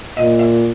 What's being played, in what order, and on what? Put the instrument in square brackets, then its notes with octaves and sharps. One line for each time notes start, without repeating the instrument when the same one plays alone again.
[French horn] A#2 [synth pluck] D#5
[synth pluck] E5